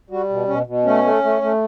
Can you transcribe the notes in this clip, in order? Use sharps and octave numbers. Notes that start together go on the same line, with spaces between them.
G3 F#4
B2
B2 C#4
B2
A3 C#4
A3
A3
A3